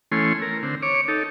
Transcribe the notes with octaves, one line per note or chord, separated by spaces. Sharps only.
E3 A3 C#4 G#5 C6
A#4
D3 C4
C#5 D6
D#4 A4